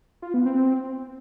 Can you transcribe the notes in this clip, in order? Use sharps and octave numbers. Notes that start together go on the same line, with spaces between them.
F4
B3
C4